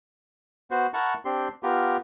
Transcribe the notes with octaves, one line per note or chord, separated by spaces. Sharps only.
B3 F#4 C5
E4 A#4 F#5 A5 C#6
C4 D4 G4 C6
B3 F4 G4 A#4